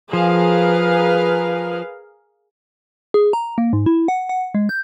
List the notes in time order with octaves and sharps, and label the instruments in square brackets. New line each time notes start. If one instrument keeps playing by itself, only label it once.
[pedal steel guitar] F3 [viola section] G#4 A#4 F5 [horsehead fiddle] B4
[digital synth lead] G#4
A#5
A#3
G#2
E4
F#5
F#5
G#3
G6